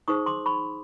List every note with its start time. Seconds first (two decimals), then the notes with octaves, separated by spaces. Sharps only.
0.08 D#4 G#4 C5 C#6 D#6
0.26 C6 D6
0.46 B5 C#6